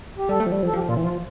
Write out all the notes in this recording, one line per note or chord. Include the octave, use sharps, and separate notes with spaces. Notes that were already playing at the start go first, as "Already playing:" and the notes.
G4
G3 A4
A3
F3
G3
F3
A4
F3 G4
A#2 F4
E3
F3 F4